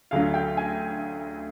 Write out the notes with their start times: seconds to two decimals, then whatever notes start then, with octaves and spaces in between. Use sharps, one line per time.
0.11 D2 D3 F#3 F5
0.34 G5
0.57 G#5